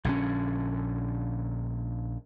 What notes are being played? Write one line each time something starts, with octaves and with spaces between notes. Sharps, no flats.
A#1 D3 D#3 C#4